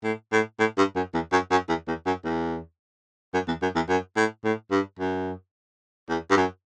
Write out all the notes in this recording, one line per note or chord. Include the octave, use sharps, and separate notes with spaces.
A2
A2
A2
G2
F#2
E2
F#2
F#2
E2
E2
F#2
E2
F#2
E2
F#2
E2
F#2
A2
A2
G2
F#2
E2
G2
F#2